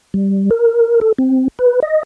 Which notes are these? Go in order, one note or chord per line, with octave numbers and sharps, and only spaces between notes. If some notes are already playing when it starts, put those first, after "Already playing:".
G3
A#4
A4
C4
B4
D#5